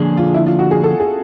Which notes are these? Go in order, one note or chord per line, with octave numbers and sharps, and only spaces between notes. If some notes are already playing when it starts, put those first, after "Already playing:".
Already playing: D3 F3 A#3 D4 G#4
F4
E4
F4
F#4
G#4
A4
G#4